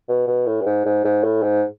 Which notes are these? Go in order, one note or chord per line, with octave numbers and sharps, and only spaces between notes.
B2
B2
A2
G2
G#2
G#2
G#2
A2
G#2